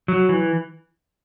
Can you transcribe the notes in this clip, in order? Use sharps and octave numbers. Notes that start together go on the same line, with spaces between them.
F#3
E3